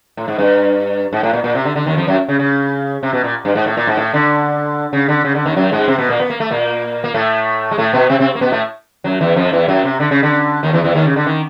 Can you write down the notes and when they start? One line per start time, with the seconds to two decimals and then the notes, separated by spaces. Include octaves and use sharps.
0.17 A2
0.28 G#2
0.38 G2
1.13 G#2
1.23 A2
1.33 A#2
1.44 A#2
1.55 C3
1.65 D3
1.76 D3
1.86 D#2 D#3
1.97 F2 F3
2.07 F#2 F#3
2.28 C#3
2.39 C#3
3.03 C3
3.13 B2
3.24 A#2
3.45 G2
3.55 G#2
3.66 A2
3.77 A#2
3.87 G#2
3.97 A2
4.14 D3
4.93 C#3
5.08 D3
5.25 C#3
5.35 D3
5.46 D#2 D#3
5.56 F#2 F#3
5.72 G#2 G#3
5.88 C3 C4
5.98 B2 B3
6.09 A#2 A#3
6.20 B3
6.30 A#3
6.40 A3
6.51 A#2 A#3
7.04 A#3
7.14 A2 A3
7.71 G#3
7.78 A2 A3
7.93 B2 B3
8.09 C3 C4
8.20 C3 C4
8.35 A#3
8.41 B2 B3
8.52 A2 A3
9.04 F#2 F#3
9.21 E2 E3
9.36 F2 F3
9.52 E2 E3
9.68 F#2 F#3
9.84 C3
10.00 D3
10.11 C#3
10.23 D3
10.63 D#2 D#3
10.73 E2 E3
10.84 E2 E3
10.95 D#2 D#3
11.05 C#3
11.16 D3
11.27 D#3